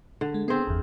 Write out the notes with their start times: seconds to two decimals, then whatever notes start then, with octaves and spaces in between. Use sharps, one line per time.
0.21 D3
0.34 G#3
0.48 B3 C4 G#4
0.67 G1 E2